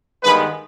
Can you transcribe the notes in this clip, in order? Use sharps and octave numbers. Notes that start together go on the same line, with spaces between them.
G2 D#3 G#3 B3 B4